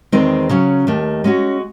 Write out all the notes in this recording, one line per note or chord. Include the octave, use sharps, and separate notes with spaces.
E2 D#3 G#3 C4 D#4
C#3 F#3 C#4
D#2 D#3 A3
G#3 C#4 F#4